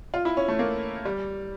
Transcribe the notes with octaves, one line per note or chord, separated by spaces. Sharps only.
F4
E4
C#4
A3
A#3
G3